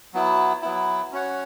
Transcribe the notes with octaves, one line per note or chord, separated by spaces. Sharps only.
F#3 B3 E4
F#3 B3 E4
C#4 F#4 C#5 F#5